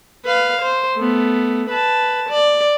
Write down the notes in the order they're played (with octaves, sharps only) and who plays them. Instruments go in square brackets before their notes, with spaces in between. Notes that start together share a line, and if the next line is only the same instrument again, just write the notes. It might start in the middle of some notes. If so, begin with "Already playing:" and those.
[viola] B4 F5
C5
A3 B3
B4 A5
D5